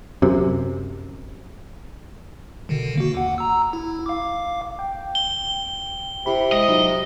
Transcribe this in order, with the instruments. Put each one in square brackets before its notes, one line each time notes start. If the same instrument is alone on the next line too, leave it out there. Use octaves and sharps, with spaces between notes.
[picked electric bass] F#2 C3
[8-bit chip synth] B2 D3 D#3
A#3 F#4
D#2 F#5
A#5 E6
E4
F5 D6
[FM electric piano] G5
[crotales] G7
[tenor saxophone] C3 [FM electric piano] E4 G4 B5
[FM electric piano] G#3 [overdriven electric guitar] D#5
[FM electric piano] F#3 D#4 F4